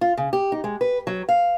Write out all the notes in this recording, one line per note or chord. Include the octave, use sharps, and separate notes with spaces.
F4
C#3
G4
D#4
G#3
B4
F#3
F5